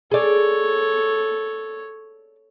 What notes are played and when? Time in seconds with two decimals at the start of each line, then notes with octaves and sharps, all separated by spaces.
0.11 G#4 A4 C#5 D5